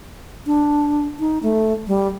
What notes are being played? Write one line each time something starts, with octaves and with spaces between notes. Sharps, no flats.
D4
D#4
A3
G3